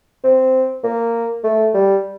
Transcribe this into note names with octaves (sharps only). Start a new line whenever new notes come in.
C4
A#3
A3
G3